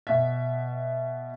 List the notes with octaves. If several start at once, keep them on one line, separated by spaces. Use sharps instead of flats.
B2 E5